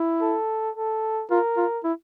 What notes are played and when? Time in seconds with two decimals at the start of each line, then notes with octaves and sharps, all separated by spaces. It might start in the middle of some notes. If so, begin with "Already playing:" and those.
Already playing: E4
0.21 A4
0.75 A4
1.31 F4 A#4
1.57 F4
1.84 E4